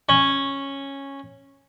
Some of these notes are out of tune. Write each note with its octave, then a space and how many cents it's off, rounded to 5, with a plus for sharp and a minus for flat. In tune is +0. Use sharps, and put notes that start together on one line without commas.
C#4 -10